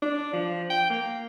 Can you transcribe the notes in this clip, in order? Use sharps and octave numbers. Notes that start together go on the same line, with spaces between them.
D4
F3
G5
A#3